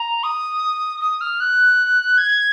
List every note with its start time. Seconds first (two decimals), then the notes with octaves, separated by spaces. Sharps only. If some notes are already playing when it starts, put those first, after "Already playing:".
Already playing: A#5
0.23 D#6
1.01 D#6
1.21 F6
1.40 F#6
2.17 G#6